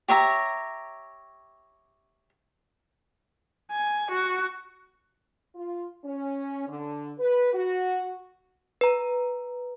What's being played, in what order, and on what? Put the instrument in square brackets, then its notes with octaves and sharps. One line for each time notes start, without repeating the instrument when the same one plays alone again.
[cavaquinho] G4 C#5 E5 A#5
[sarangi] G#5
F#4
[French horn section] F4
C#4
D3
B4
F#4
[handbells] B4 A#5